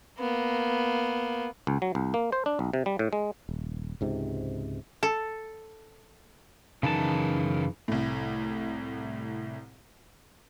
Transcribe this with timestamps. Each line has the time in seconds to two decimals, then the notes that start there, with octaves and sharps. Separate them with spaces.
0.20 A#3 B3
1.67 C#2
1.82 F#3
1.95 C2
2.14 A#3
2.32 C5
2.46 D4
2.59 B1
2.74 C3
2.86 G3
2.99 A2
3.13 G#3
3.49 D#1
4.01 C#2 G#2 C3
5.03 A4
6.83 F#2 C#3 E3 D#4 A#4 A5
7.88 C2 A2